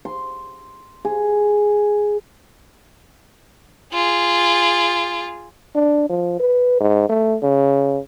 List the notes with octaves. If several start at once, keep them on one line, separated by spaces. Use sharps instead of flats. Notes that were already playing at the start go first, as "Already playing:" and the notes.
C6
G#4
F4 G#4
D4
F3
B4
G#2
A3
C#3